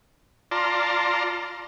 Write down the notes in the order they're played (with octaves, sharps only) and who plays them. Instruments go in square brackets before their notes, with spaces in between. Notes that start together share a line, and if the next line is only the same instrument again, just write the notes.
[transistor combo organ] F4 D5 A5 A#5 C6